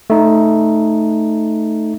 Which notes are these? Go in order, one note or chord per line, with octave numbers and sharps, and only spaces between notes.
A3 D#4